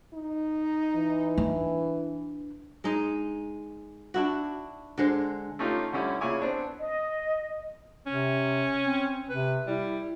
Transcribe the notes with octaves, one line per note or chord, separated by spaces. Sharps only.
D#4
E3
D4
G#3 D#4
D4 E4 F#4
D3 G#3 C5
A3 C#4 D#4 F4 G4
D3 G3 C#4 E4
A#2 C#3 E4 C#5 G#5 D6
B3 C4 D4
D#5
C3 C#4
C4
C3 B4
G3 E4